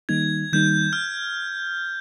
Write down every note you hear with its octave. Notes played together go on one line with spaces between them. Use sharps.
D#3 G3 A#3 D#4 G#6
D#3 G3 A#3 D#4 G6
F6